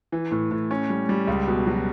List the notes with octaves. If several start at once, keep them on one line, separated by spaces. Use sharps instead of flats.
E3
A2
A2
C#4
G3
G3
C#2
B2
F#3